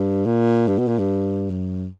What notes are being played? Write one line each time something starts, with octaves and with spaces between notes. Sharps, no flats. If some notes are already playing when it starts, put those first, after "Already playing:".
Already playing: G2
A#2
G2
B2
A#2
G2
F#2